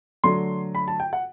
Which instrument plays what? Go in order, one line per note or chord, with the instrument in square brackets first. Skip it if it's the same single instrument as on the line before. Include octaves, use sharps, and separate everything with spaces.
[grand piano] D3 F#3 A3 D4 C6
B5
A5
G5
F#5